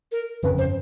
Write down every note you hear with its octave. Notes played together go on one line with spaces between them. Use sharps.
A#4
G1 F2 C#3 B4
C5